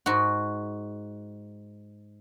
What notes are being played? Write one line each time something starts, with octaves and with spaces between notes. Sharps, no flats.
G#2 F#4